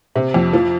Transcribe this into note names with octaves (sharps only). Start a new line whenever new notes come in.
C3
F2
F3